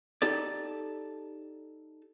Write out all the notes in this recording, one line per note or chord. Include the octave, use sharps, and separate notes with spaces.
D#4 G4 A4 D5